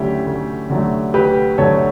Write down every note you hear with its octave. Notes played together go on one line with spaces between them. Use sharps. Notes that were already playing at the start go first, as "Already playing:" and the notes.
Already playing: D2 D3 F#3 A3 C#4 E4 G4
D2
D3 F#3 A3
D2 G4 B4
D3 F#3 A3 A4 C#5